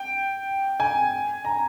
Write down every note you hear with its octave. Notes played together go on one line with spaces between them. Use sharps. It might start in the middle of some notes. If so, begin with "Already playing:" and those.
Already playing: G5
G#5
A#5